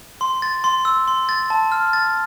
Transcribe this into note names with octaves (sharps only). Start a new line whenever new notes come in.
C6
A6
C6
E6
C6
A6
A5
F6
A6